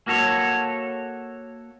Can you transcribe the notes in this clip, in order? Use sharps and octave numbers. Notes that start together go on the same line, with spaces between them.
A#3 F#4 A4 C#5